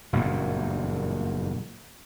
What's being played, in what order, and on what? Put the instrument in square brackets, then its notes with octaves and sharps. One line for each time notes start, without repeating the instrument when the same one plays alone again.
[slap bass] F#1 E2 G2 A#2